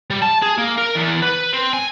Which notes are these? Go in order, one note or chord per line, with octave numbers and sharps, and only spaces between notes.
G3
A5
G#4
A#3
A#4
E2
B4
C4
G#5